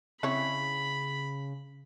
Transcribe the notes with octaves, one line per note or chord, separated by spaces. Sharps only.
C#3 C4 E4 C#5 B5